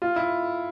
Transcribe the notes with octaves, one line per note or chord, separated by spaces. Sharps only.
F4
E4